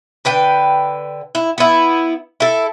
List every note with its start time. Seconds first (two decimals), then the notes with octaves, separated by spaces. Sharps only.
0.25 D3 B4 G5
1.35 E4
1.58 B3 E4
2.40 E4 A4